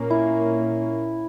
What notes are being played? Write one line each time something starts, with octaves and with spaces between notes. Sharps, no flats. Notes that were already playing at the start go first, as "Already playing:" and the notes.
Already playing: A#2 A#3 C#4
E4